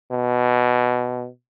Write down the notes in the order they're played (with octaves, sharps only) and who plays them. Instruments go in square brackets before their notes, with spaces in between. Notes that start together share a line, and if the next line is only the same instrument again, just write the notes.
[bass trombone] B2